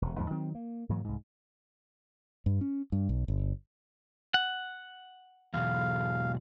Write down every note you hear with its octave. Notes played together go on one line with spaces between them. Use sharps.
E1 C3
D#2 G#2 F3 G#3
D#3 F#3 C4
A#3
G#2 E3 F#3 A#3
C2 G#2
G2
C#4
G2
B1
G1
F#5
B1 E2 F5